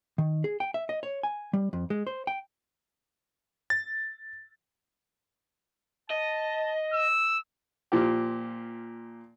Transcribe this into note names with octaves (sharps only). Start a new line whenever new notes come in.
D#3
G#4
G5
E5
D#5
C#5
G#5
G3
F2
G#3
C5
G5
A6
D#5 A5
E6
A#2 F3 G4